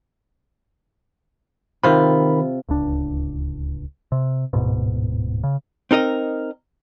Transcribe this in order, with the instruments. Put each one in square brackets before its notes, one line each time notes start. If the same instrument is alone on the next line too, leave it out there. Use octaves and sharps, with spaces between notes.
[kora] C3 F4 [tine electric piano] D#3 B5
[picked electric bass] D1 C#2 D4
C3
D1 G#2 B2
C#3
[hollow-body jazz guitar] C4 D#4 A#4 D#5